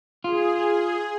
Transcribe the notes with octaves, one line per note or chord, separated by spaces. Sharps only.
F4 G#4